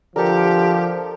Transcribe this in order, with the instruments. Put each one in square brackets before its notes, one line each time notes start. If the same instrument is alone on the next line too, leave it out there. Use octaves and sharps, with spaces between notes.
[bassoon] D3 [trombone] F3 [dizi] G4 [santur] A4 A#4